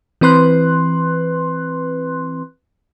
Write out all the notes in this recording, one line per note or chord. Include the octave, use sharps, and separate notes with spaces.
E3 C4 B4 C6 F#6